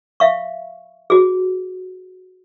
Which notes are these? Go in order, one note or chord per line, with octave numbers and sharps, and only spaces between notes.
E5 F5 C#6
F#4 G#4